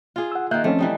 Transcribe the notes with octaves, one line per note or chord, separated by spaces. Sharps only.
F4 G#4
F#5 E6
D#3 A#3 E5 F#6 G6
F3 A3 C4 C#4
E3 G3 D#4